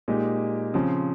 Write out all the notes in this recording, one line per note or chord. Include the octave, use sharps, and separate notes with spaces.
A#2 G#3 D#4 G4
C#3 F3 C4